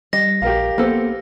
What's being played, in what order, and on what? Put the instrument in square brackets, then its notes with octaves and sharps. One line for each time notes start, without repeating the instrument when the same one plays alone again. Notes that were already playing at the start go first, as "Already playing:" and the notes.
[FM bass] G3 [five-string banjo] D#5 [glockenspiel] A#6
[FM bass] A#1 [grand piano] G4 A#4 F5
[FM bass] A#3 [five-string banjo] B3 A4 C5